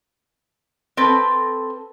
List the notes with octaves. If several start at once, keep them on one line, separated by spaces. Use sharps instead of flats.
C4 A4 B4